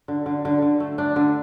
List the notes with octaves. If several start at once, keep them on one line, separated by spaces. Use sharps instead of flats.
D3
D3
D3
D3
A3
D4
D3